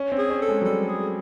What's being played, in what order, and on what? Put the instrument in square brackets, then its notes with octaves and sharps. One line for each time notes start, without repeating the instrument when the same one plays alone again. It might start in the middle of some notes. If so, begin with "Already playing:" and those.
Already playing: [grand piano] C#4
C4
[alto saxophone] G#4
[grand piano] C#4
[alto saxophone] A4
[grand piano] G#3
F#3
[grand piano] G3 [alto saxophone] A4
[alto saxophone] G#4